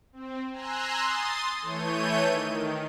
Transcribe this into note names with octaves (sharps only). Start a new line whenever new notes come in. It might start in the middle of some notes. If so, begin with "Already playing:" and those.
C4
G#5 A#5 C6 E6 F#6
C6 D#6 A6
E3 A3 C#5 G6 D#7
D#3